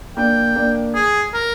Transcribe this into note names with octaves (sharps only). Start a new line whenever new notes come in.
A#3 D4 G5
A#3 D4
G#4
A#4